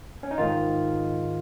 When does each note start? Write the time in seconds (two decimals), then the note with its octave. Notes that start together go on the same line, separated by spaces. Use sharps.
0.23 C#4
0.31 D#4
0.38 G#2 D#3 F4